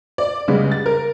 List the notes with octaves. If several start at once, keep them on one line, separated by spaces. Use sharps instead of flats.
D5
C#3 G3 G#3 B3
A6
A#4